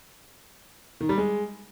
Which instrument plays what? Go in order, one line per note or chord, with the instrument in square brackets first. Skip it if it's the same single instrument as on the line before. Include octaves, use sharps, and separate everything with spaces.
[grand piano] D#3
G3
G#3